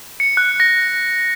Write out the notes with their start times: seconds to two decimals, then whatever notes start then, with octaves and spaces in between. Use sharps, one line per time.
0.20 C#7
0.37 F#6
0.60 A#6